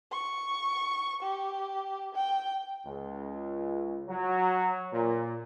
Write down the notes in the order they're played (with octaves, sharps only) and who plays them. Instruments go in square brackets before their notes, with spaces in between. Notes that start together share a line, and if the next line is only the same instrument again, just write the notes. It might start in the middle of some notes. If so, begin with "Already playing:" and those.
[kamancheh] C#6
G4
G5
[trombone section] C#2
F#3
A#2